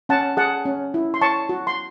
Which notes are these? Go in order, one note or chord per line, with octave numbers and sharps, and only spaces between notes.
C#4 F#5 A5
G#4 F#5 A5
C#4
E4
C6
C#5 A5 C#6
F#4
C6